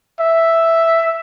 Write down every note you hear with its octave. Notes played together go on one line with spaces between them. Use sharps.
E5